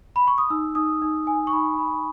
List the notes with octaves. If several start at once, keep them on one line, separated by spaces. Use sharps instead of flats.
B5
C#6
D#6
D#4 E6
D#4 D#6
D#4
D#4 G#5
C#6
D#4 B5
D#4 B5